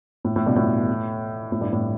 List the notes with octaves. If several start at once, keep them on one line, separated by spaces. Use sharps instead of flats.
A2
A2
G2 B2
A2
A2
G2
A2